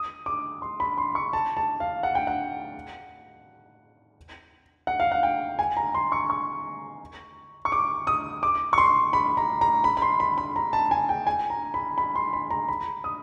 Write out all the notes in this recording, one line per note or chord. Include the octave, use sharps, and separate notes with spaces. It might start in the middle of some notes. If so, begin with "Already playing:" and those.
Already playing: D#6
D6
C6
B5
C6
C#6
A5
A5
F5
F#5
G5
F#5
F#5
F5
F#5
G5
G#5
A#5
C6
C#6
C#6
C#6
D6
D#6
D6
C#6
C6
B5
A#5
A#5
B5
B5
C6
B5
B5
A#5
A5
G#5
G5
G#5
A#5
B5
B5
C6
B5
A#5
B5
D#6